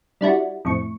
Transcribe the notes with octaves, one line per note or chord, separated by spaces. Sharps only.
G3 D4 E4 F#4
F2 A2 C#6